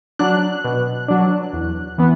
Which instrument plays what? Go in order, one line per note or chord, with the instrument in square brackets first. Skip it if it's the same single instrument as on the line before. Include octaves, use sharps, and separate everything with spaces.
[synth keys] F#3 D4 F#6
B2
F#3 D4
E2
E3 B3